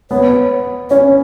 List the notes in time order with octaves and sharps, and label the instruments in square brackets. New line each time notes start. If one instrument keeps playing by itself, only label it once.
[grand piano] B3 [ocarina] C#5
[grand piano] C#4 [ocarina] C#5